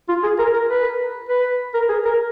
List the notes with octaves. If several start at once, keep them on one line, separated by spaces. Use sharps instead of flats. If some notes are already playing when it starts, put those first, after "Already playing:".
F4
G#4
A#4
A#4
B4
B4
A#4
G#4
A#4